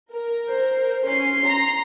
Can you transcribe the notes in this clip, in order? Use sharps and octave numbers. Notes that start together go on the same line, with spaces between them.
A#4
C5
C#4 C6 C7
A#5